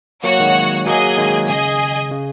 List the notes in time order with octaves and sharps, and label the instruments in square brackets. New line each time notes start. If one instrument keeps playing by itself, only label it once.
[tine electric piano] F#3 A#3 [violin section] F#4 C#5 F#5
[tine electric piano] D#3 G#3
[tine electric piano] F#3 A#3 [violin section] G#4 D#5 G#5
[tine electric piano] D#3 G#3
[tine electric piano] C#3 [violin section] G#4 D#5 G#5
[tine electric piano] C#3